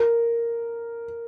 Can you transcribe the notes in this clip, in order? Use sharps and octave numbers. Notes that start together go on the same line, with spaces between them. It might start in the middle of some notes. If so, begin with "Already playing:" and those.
Already playing: A#4